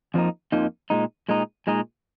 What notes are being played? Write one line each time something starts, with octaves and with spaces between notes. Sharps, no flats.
F2 F3 A#3 D#4
F2 F3 A#3 D#4
A#2 G#3 D#4
A#2 G#3 D#4
A#2 G#3 D#4